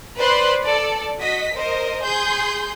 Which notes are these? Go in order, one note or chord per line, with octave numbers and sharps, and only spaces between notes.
B4 C5 D5 B5 C6 F#6
A4 D5
F#4 D#5 B6
A#4 C5 D#5
G#4 C6 G6